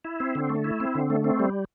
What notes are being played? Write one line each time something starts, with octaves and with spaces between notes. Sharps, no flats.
E4
C4
D3
A3
E4
C4
D3
A3
C4
G3